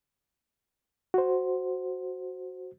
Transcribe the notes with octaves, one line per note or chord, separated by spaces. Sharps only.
F#4 C5